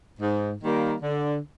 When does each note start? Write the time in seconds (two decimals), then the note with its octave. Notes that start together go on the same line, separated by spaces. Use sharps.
0.20 G#2
0.61 D#3 G3 A#3
1.03 D3